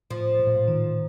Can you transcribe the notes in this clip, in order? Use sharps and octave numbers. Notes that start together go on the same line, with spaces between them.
A2 F3
A#2
A2
A#2
D#3